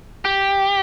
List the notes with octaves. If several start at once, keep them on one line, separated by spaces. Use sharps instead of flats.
G4